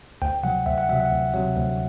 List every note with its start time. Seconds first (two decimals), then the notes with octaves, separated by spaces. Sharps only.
0.22 D2 G5
0.43 C3 F#3 F#5
0.66 D2 E5
0.78 F#5
0.89 F#3 E5
0.93 C3
1.00 F#5
1.11 D2
1.34 C3 F#3
1.57 D2